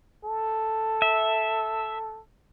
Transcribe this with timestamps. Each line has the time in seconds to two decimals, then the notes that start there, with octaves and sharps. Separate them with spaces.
0.24 A4
1.02 E5